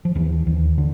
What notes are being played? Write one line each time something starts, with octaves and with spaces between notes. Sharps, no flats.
F3
D#2 E3
D#2
D3